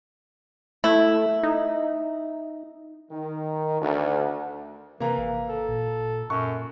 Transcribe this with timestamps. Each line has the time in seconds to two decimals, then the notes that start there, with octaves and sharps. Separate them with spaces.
0.84 A3 E4
1.43 D#4
3.10 D#3
3.80 D2
5.00 C3 E3 A#3 A#5
5.18 G#1
5.49 A4
5.68 A#2
6.30 F#2 A#2 C#6